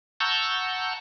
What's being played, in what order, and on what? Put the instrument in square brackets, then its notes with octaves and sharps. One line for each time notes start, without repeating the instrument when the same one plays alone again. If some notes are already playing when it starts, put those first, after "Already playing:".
[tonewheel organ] F#5 A5 A#5 C#6 E6 G6